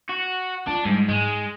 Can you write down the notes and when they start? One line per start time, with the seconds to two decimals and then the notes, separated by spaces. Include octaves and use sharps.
0.09 F#4
0.67 D4 F4
0.85 G#2 G3
1.08 G#2 G#3